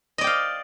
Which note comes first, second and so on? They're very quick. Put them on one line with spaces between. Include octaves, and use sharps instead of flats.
D#5 D5 G5 F5